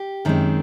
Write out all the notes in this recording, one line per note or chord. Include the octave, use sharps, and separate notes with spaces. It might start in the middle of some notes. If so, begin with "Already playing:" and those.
Already playing: G4
F#2 D#3 G#3 C4